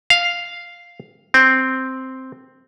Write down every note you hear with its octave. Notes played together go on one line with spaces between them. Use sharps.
F5
C4